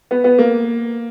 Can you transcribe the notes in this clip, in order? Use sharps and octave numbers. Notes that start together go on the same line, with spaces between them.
B3
B3
A#3